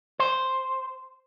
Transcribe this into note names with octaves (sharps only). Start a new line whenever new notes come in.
C5